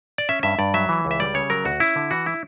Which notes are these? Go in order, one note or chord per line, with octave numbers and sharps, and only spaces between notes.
D5
C#4 E5
G2 E5
G2 D5
F#3 E5
E3
C#2
E5
G3 D5
C#3 C#5
F#3 A#4
D2 F#4
C#4 E4
D3
E3 F#4
E4